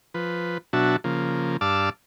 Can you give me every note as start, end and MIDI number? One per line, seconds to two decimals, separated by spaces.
0.14 0.58 53
0.14 0.58 71
0.73 0.96 47
0.73 0.96 54
0.73 0.96 62
0.73 0.96 66
0.73 0.96 76
0.73 0.96 81
1.04 1.57 49
1.04 1.57 53
1.04 1.57 58
1.61 1.90 43
1.61 1.90 74
1.61 1.90 77
1.61 1.90 81
1.61 1.90 86
1.61 1.90 88